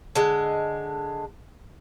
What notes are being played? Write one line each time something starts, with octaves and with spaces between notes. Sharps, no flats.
D3 G#3